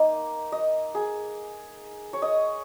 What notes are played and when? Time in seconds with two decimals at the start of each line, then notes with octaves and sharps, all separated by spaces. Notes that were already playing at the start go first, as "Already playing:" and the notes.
Already playing: A#3 D#4 D#5
0.52 D#5
0.95 G#4
2.13 C#5
2.22 D#5